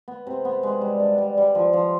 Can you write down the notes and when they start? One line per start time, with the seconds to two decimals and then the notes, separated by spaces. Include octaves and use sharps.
0.08 B3
0.27 C3
0.45 B3
0.63 G#3
0.81 G3
1.00 D4
1.18 G3
1.38 G3
1.55 F3
1.73 F3